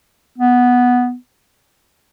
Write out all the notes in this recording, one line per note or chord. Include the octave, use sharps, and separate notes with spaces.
B3